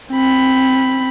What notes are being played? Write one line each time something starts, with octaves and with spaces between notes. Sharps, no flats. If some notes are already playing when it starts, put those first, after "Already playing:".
C4 B5